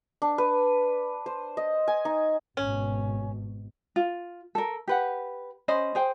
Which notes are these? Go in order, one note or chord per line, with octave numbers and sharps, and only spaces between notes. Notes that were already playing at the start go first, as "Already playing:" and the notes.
D4
B4
C5
D#5
G#5
D#4
G#1 B2 C#4
F4
A4 A#4
G4 B4 F#5
C#4 C5 D#5 B5
G#4 C5 G5